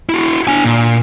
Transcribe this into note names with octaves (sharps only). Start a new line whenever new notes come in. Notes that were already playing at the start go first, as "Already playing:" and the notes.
E4 F#4
D4 G#5
A#2